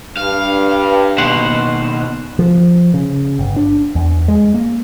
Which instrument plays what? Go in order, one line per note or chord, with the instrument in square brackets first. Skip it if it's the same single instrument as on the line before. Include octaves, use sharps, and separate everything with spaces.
[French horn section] G2 [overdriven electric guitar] F5
[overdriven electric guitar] D#2 B2 [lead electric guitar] C5 F#5
[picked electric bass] F3
C#3
G1
D4
E2
G#3
A#3